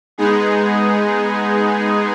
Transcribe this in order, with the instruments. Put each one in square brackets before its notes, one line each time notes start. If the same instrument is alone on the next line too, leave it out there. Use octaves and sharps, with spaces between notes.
[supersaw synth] G#3 B3 D#4 G#4